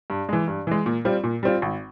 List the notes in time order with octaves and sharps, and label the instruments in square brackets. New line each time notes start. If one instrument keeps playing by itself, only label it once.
[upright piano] G2
E3 G#3
G2
E3 G#3
A#2
G3 C4 F4
A#2
G3 C4 F4
G#1